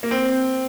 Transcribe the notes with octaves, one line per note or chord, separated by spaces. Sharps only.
A#3
C4